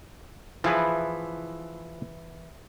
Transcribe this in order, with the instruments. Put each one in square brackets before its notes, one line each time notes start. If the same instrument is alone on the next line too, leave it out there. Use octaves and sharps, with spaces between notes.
[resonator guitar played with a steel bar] E3 [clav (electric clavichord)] F3 G#4 B4